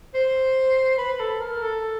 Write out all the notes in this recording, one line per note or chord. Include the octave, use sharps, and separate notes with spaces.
C5
B4
A4
A#4
A4